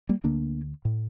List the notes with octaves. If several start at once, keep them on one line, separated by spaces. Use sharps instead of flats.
G3 A#3
D2 D3 A#3 D4
A2